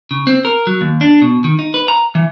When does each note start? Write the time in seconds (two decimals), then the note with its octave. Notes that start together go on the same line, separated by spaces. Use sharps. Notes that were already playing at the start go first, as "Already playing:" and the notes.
0.11 C#3
0.27 C4
0.45 A#4
0.67 F#3
0.81 D#2
1.01 D4
1.22 B2
1.44 D#3
1.59 D#4
1.74 B4
1.88 A#5
2.15 E3